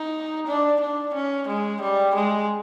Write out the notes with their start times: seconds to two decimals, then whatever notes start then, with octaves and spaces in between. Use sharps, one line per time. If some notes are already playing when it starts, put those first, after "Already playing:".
Already playing: D#4
0.47 D4
0.80 D4
1.14 C#4
1.48 G#3
1.81 G3
2.15 G#3